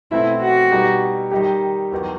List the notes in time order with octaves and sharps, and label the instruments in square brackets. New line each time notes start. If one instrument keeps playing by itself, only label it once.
[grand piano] B2 A3 C4 [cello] E4
[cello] F#4
[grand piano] B2 G3 D#4 G4
D#3 G3 D#4 G4
E2 D#3 F#3